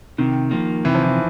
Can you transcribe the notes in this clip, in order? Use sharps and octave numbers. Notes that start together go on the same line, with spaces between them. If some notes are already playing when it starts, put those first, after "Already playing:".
C3 D#3
F3 A#3
C3 E3
F3
E3